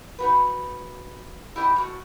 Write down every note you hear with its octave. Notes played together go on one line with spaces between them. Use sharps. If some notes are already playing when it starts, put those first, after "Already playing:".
D#4 F#4 B4
E4 G4 D#5
A2 F#4